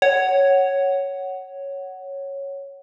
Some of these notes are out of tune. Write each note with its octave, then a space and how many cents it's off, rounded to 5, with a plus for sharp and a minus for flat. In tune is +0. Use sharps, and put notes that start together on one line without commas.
C#5 +0 F#5 +10